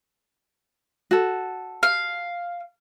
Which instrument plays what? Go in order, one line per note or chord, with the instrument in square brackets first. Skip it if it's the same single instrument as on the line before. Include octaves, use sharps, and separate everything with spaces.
[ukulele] F#4 A4
[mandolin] F5